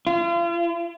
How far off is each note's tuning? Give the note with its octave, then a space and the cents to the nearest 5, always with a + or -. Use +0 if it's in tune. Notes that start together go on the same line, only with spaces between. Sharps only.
F4 -40